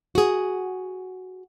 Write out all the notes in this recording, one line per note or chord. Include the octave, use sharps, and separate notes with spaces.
F#4 G#4